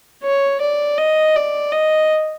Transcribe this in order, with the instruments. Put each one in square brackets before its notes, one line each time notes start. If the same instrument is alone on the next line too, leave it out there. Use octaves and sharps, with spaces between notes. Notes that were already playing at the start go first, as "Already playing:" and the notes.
[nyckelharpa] C#5
D5
D#5
D5
D#5